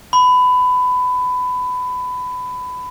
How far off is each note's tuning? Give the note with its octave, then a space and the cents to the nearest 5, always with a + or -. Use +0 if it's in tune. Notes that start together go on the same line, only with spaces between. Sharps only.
B5 +20